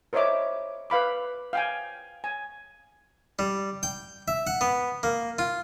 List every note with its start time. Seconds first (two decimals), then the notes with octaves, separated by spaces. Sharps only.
0.13 A#4 C5 C#5 D#5 E5 D6
0.90 B4 F5 B5 D6
1.53 F5 G5 G#5
2.24 G#5
3.39 G3
3.83 G5
4.28 E5
4.47 F#5
4.61 B3
5.03 A#3
5.39 F4